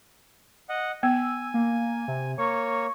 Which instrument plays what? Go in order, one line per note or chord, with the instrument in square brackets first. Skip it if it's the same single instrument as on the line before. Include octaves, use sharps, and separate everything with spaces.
[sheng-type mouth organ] D#5 F#5
[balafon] B3 [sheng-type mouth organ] G#5 [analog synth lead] E6
[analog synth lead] A#3
C3
[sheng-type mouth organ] A#3 C#5 [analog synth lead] C#6